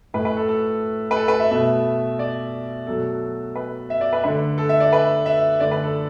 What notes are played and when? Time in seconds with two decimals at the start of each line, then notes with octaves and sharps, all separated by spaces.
0.14 A2 A3 B4
0.25 B4
0.37 A4
0.48 A4
1.11 B4
1.16 A4
1.28 B4
1.40 E5
1.51 B2 A3 E5
2.19 D5
2.87 B2 F#3 A3 A4
3.56 B4
3.90 E5
4.01 D5
4.13 B4
4.24 D3 A3 B4
4.58 A4
4.69 E5
4.80 D5
4.93 B4
5.26 E5
5.60 D3 A3 D5
5.71 B4
5.83 A4